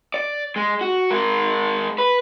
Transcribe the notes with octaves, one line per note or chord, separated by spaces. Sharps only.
D5
G#3
F#4
G#3 A#4
B4